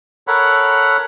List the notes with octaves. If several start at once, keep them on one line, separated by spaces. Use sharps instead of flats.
A4 A#4 C#5 F#5 B5